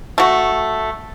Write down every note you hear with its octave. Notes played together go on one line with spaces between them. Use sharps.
A3 F#4